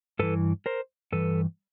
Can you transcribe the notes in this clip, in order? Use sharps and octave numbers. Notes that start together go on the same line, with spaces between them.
G2 E3 A4 B4
A#4 C5
G2 E3 A4 B4